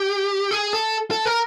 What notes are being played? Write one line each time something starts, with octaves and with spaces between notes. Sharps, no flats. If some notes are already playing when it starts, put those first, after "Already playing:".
Already playing: G4
G#4
A4
A4
A#4